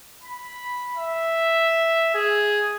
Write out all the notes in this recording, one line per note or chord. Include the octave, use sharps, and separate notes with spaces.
B5
E5
G#4